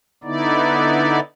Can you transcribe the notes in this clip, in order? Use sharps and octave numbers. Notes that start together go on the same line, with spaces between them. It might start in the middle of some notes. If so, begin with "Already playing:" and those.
D3 B3 D#4 E4 D5